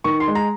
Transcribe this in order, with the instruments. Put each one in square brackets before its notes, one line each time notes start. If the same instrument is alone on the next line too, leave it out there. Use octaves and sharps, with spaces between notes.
[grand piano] D#3 C#6
C6
G#3
A#5